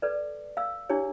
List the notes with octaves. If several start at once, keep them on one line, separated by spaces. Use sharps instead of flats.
A4 B4 D5
F5 E6
D4 E4 G4 G#4 C#5